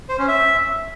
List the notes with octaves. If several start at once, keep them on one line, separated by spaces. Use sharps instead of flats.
C5
C#4
E5